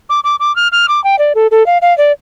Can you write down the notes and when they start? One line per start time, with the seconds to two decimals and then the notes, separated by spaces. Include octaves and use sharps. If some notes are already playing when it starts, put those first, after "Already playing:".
0.10 D6
0.24 D6
0.40 D6
0.56 F6
0.72 F6
0.88 D6
1.04 G5
1.19 D5
1.35 A4
1.51 A4
1.66 F5
1.82 F5
1.98 D5